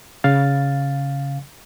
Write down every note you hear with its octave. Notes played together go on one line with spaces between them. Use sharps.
C#3 F5 A6